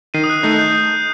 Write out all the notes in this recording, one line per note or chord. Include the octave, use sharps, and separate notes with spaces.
D#3 C7 D#7
D#6
F#6
A3 D#4 G6
G6